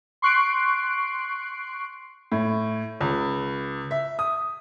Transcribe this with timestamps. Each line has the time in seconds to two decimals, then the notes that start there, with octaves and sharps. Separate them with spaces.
0.22 C6 C#6 F#6 C7 D7
2.32 A2
3.00 C#2
3.91 E5
4.19 D#6